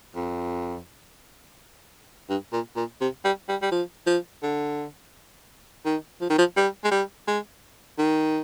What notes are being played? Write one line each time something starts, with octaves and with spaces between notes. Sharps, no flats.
F2
G2
A#2
A#2
C3
G3
G3
G3
F3
F3
D3
D#3
F3
D#3
F3
G3
G#3
G3
G#3
D#3